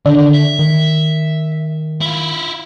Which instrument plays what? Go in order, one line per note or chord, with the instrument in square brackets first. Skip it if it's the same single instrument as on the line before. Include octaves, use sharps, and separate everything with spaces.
[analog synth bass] D3 [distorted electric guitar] D#3 [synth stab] D4
[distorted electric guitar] E5
[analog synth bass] D#3
[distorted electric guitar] E4 F4